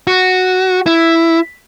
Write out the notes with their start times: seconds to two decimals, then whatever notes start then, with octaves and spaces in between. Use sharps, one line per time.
0.07 F#4
0.86 E4